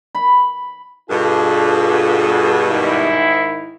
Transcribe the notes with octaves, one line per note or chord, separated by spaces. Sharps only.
B5
G2 B2 F4 G#4 A4
G#2 D#3 E4